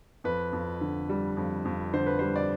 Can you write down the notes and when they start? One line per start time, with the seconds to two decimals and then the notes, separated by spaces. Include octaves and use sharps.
0.24 F2 B4
0.53 F2
0.81 D3
1.09 G3
1.37 F2
1.65 F2
1.93 D3 C5
2.06 B4
2.19 G3 C5
2.36 D5